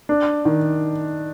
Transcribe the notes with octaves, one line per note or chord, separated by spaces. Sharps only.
D4
D#3